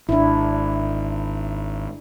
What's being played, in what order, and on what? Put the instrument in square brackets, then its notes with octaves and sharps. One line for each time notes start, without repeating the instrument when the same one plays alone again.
[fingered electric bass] G#1 [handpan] D4 E4